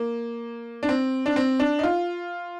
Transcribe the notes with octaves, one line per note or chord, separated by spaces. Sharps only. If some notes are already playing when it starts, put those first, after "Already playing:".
Already playing: A#3
D4
C4
D4
C4
D4
D#4
F4